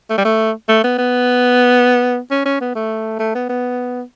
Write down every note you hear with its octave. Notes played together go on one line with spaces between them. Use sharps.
A3
G3
A3
A3
B3
B3
C#4
C#4
B3
A3
A3
B3
B3